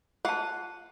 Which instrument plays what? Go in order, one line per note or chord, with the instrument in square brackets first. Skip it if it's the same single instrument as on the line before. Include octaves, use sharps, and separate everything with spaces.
[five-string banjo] F4 F#5 [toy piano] G#4 A5